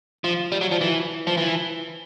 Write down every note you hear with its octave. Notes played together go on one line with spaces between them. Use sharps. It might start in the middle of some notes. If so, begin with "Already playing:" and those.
F3
G3
F#3
F3
E3
F3
E3